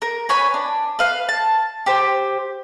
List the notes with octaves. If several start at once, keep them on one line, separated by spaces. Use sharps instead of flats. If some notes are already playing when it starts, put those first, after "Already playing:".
A#4
B4 C#5 G#5 B5
D4
B4 F5
A5
G4 C5